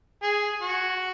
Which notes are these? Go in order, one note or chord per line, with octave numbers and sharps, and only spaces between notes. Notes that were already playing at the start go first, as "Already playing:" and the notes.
G#4
F#4